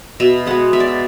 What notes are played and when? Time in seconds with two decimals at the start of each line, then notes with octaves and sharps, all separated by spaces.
0.20 B2 E5
0.46 G#3 B3 F#5
0.73 B2 E5
0.80 D5
0.88 E5